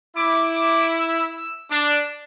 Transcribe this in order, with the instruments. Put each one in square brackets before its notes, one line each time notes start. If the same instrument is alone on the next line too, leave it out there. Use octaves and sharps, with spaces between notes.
[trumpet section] E4 [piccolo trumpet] D6
[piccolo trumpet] D6
E6
[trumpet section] D4 [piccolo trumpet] D6